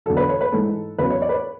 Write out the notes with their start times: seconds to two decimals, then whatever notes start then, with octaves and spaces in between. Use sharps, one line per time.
0.06 E2 D3 F#3 A4
0.17 B4
0.29 C#5
0.41 B4
0.52 G#2 E3 A4
0.98 E2 C#3 F#3 B4
1.10 C#5
1.22 D5
1.29 B4
1.34 C#5